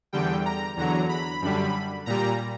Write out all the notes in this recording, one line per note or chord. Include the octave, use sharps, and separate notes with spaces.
E2 D3 G3 G5
A#5
E2 D3 F#3 A#5
B5
F#2 D3 G3
A#2 G3 A#5